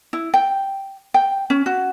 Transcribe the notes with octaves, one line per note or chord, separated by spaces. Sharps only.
E4
G5
G5
C#4
F#4